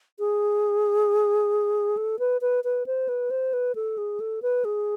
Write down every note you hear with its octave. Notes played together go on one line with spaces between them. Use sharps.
G#4
A4
B4
B4
B4
C5
B4
C5
B4
A4
G#4
A4
B4
G#4